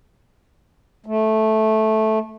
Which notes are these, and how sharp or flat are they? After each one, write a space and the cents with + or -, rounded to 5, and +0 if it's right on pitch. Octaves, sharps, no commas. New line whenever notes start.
A3 -10